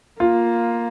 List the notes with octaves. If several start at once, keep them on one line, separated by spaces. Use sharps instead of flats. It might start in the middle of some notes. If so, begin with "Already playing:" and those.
A#3 F4